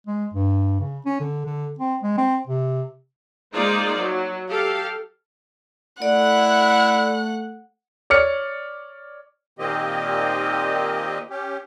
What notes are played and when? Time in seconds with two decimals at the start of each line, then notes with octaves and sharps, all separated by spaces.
0.07 G#3
0.34 G2
0.80 C#3
1.06 C#4
1.20 D3
1.46 D3
1.79 C4
2.03 G#3
2.18 C4
2.47 C3
3.54 G#3 A#3 D#4 F4 C5 D5
3.98 F#3
4.49 G4 A4 F5
6.02 A3 E4 D5 F#5 F#6
8.10 C#5 D5 F6 C#7
9.59 A#2 D#3 A#3 C4 G4 D#5
11.30 C#4 G4